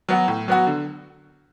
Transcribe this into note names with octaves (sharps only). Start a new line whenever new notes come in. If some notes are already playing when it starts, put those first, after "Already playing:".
F#3 B3 F#4
A2
F#3 B3 F#4
D3